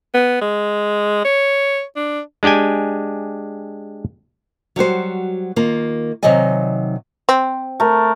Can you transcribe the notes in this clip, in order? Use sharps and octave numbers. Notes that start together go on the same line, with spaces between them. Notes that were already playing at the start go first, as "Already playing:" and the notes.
B3
G#3
C#5
D4
G#3 D4 G4 G5 G#5
F#3 G3 F#4 C5
D#3 A#3 F4
C3 D#3 F#3 D5 D#5 G#5
C4
A3 A#4